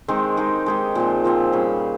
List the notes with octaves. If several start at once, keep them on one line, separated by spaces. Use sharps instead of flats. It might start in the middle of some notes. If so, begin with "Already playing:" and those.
D#3 G#3 C4 D#4
G#3 D#4 G4
G#3 D#4 G4
A#2 F3 C4
A#2 F3 C4
G3 C#4 G#4